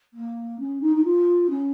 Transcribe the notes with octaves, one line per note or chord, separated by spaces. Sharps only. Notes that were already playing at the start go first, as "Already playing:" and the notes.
A#3
C#4
D#4
D#4
F4
C#4